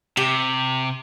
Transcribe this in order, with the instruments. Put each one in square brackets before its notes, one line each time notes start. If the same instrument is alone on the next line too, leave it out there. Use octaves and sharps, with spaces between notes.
[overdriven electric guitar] C3 [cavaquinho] G4